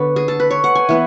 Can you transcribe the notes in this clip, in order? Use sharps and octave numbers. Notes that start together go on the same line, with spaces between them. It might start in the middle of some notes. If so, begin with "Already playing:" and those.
Already playing: D3 B3 D4 B4 C#5
G#4
A4
B4
C#5
F#5
G#5
E3 B3